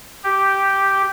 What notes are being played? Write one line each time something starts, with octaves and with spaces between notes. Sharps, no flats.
G4